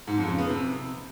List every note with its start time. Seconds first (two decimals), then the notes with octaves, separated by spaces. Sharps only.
0.07 G#2
0.18 F2
0.28 C#3
0.38 B3
0.49 C3